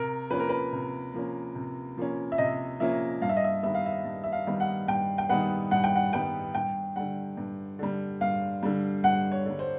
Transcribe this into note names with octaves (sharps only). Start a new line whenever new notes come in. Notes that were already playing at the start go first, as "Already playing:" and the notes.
Already playing: C3 A#4
F3 A#3 C#4 B4
A#4
B4
C3
F3 A#3 C#4
C3
F3 A#3 C#4
E5
C3 D#5
F3 A#3 C#4 E5
G2 F5
E5
D#5
E5
D#3 G3 B3 E5
F5
E5
G2
E5
F5
D#3 G3 B3
F#5
G2 G5
G5
D#3 G3 B3 F#5
G2 F#5
G5
F#5
D#3 G3 B3 G5
G2 G5
D3 G3 F#5
G2
D3 G3
G2 F5
D3 G3
G2 F#5
C#5
D3 G3
C5